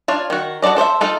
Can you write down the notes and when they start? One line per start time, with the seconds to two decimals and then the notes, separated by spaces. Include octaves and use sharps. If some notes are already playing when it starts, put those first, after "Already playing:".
0.08 D4 F4 C#5
0.30 D#3 F#4
0.62 F#4 A4 C5 D5 D#5
0.76 A4 C5 D5 E5
1.01 A3 D#4 F4 A4